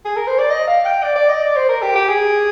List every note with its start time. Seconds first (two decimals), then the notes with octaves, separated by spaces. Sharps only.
0.05 G#4
0.16 A#4
0.27 C5
0.39 D5
0.50 D#5
0.67 F5
0.85 G5
1.03 D5
1.16 D5
1.29 D#5
1.42 D5
1.56 C5
1.69 A#4
1.82 G4
1.95 G4
2.09 G#4